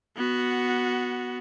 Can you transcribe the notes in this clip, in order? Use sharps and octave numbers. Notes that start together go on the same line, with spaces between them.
B3 F#4